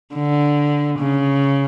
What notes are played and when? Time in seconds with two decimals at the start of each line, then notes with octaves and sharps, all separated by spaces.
0.15 D3
0.99 C#3